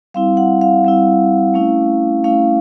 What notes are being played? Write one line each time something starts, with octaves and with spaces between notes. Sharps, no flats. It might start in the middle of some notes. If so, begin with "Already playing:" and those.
G3 C4 E4 F5
F#5
F5
G3 C4 E4
A3 C#4 E4
A3 C#4 E4 F5